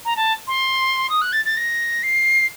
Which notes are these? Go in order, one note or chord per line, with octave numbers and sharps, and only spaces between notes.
A#5
A5
C6
D#6
F#6
A6
A6
A#6
C7